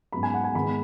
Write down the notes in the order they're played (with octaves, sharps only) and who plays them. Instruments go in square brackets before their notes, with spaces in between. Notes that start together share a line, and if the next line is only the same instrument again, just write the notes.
[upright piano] G#2 F#3 B3 B5
G#5
F#5
G#5
G#2 D#3 B3 B5